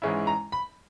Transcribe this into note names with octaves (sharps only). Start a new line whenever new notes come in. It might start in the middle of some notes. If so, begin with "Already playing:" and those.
G#2 E3 G#3 C#4 E4
A#5
B5